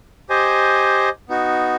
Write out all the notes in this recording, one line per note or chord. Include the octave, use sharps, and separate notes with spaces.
G4 C5 D#5 G#5
B3 D#4 F#4